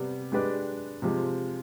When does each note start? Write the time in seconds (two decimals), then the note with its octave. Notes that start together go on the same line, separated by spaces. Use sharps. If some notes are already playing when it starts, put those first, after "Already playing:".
Already playing: C3 G3 B3
0.32 G#3 D4 G4 B4 D5
1.02 C3 F3 G#3